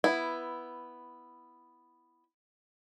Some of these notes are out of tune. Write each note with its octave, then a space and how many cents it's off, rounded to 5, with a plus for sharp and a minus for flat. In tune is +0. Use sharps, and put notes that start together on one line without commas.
B3 +0 E4 +5